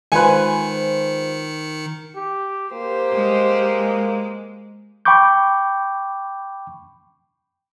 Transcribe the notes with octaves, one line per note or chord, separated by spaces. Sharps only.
D#3 G#3 F4 B4 C5 G#5 C#7
G4
A#3 G4 C5
G#3
G5 B5 C#6 D6 G6